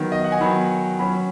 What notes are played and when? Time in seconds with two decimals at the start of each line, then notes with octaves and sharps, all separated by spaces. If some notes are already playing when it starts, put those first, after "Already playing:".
Already playing: D#3 F#3 B3
0.12 D#5
0.24 F#5
0.32 G#5
0.40 D#3 F#3 B3 B5
0.99 F#3 C#4 B5